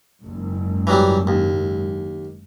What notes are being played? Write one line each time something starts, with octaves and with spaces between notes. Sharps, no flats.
F#1 G#2
E3 F#3 G3
D#2